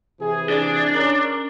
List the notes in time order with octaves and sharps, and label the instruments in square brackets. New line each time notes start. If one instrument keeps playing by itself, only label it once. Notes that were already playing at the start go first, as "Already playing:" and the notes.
[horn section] C3 E3 G#4
[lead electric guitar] D4
[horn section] C#4 A#4